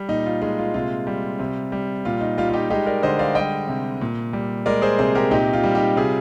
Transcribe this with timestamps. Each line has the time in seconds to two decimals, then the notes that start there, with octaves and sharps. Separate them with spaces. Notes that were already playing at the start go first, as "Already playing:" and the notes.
Already playing: G3
0.09 A#2 D#4
0.26 F4
0.41 G#3 D#4
0.58 F4
0.74 C3 F4
1.07 G3
1.39 C3
1.72 G3
2.05 A#2 F4
2.21 D#4
2.38 G3 F4
2.50 F4
2.53 D#4 G4
2.70 G#3 D#4 G4
2.86 A#4 D5
3.02 D3 C5 D#5
3.19 D5 F5
3.35 G3 D#5 G5
3.68 C3
4.01 A#2
4.33 G3
4.66 G#3 A#4 D5
4.82 G#4 C5
4.99 C3 G#4 C5
5.15 G4 A#4
5.31 A#2 D#4 G4
5.53 F4
5.63 G3
5.75 D#4 G4
5.96 C3 F4 G#4